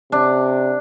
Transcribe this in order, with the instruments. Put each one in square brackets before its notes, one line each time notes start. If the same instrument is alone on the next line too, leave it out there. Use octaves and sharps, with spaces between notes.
[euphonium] C3 [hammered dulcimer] D4